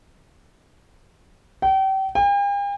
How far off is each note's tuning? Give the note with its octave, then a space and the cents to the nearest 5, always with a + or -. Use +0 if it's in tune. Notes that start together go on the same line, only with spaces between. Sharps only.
G5 -35
G5 +45